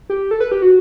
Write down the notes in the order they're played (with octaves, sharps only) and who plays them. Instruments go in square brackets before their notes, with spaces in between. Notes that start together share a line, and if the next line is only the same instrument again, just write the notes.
[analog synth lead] G4
A4
B4
G4
F#4